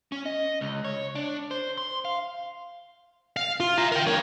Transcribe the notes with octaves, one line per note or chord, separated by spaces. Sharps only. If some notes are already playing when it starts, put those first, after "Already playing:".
C#4
D#5
C#2
C#5
D4
C5
C6
F5
F5
F4
E5 A#5
A#4 G5
G2 C#5